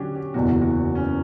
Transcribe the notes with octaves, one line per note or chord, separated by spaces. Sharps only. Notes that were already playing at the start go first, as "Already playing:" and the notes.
Already playing: D3 F#3 C#4 D4 F#4 G4
G4
F#1 E2 B2 F#4
F#4
F#4
C#4